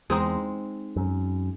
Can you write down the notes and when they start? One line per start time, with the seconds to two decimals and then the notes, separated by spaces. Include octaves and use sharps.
0.10 E2 G#3 C4 D#4
0.96 F#2